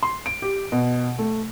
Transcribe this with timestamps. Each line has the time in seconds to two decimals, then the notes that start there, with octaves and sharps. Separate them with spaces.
0.03 C6
0.26 D7
0.42 G4
0.72 B2
1.19 A3